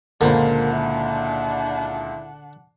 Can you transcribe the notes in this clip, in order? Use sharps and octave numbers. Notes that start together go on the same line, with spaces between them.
C#2 A#2 D3 A#3 D4 C5 F#5
E4